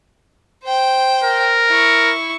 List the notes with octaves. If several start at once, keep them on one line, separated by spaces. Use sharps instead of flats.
C5 G5
A#4
E4 C#6